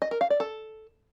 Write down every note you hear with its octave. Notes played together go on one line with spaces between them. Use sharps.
D#5
A#4
F5
D5
A4